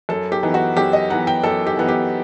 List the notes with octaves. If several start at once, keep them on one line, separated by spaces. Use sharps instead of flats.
F#2 A4
G4
E3 B3 D#4
F#4
F#2 G4
D#5
E3 B3 D#4 F#5
G5
F#2 A4
G4
E3 B3 D#4
G4